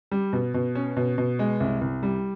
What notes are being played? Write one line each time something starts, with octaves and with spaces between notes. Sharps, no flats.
G3
B2
B2
C#4
B2
B2
G#3
C2
C2
G3